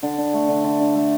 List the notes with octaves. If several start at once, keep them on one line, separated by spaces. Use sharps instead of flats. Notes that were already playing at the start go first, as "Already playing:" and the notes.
D3
D4
A3
D3
D3
D4
A3